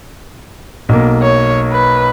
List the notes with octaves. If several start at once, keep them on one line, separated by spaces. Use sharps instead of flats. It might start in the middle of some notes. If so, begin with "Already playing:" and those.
B1 A#3
C#5
B4